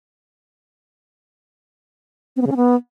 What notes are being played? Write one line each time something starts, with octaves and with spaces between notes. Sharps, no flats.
C4
B3
C#3
C#4
B3